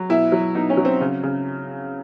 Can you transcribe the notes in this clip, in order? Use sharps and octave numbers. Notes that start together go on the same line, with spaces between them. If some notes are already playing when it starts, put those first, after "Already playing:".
Already playing: F#3
B2 E4
F#3
B2 D#4
C#4
F#3
C4
C#3
C#3